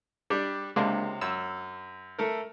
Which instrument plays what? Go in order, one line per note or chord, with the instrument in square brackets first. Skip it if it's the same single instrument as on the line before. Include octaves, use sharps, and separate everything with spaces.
[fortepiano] G3 D4 G4
[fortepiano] C#2 C3 [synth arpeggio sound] G#3 A#3 D4
[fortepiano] F#2 [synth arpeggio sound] E6
[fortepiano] A3 A4 A#4